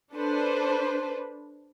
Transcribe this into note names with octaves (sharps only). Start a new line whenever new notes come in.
D4 A4 B4 C5